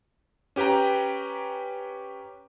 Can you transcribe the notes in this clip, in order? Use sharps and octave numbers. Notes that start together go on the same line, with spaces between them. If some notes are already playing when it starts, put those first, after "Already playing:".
C#4 G4 B4 G5 A#5